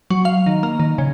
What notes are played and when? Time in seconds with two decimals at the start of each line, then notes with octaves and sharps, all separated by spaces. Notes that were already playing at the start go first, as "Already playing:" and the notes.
0.10 F#3
0.25 F5
0.46 D#3
0.63 A#3
0.80 D#3
0.98 C#3